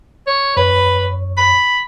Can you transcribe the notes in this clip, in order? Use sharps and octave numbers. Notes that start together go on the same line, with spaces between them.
C#5
F#2 B4 C#5
B5